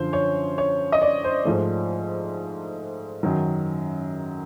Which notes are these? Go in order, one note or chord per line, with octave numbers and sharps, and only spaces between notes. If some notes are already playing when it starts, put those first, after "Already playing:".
Already playing: F#2 D3 F3 C5
C#5
C#5
D#5
D5
C5
G#2 F3 A3
F#2 D#3 F#3